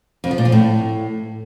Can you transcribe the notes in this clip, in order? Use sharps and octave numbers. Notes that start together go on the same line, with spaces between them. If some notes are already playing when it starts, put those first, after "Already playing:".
F2
F3
A#2
F3
A2